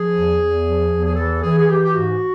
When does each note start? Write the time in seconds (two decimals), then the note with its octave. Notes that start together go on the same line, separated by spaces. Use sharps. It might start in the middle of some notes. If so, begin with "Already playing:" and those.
Already playing: F3 G#4
0.14 E2
0.39 E2
0.65 F3
0.91 E2
1.06 G#4
1.16 E3 A4
1.43 E3 G#4
1.59 G#4
1.68 E3 G4
1.85 G4
1.94 G#2 F#4